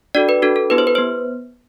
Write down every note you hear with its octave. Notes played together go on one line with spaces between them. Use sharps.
D4 F#4 A4 D5
B4
D4 F#4 A4
A4
B3 E4 G4 B4
C5
B4
B3 C5